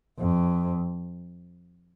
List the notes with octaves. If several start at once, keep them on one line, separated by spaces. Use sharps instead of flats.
F2